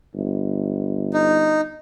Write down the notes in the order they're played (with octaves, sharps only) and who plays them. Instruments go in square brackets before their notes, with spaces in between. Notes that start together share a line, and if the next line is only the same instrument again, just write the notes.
[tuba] G1
[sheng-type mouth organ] D#4